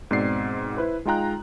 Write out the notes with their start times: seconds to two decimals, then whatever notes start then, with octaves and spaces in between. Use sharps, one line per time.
0.11 G#2 B2 C4 D5 C7
0.77 E4 B4 C5
1.05 G#3 D#4 F4 G5 A#5 F#6